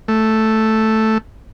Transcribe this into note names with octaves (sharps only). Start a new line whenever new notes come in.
A3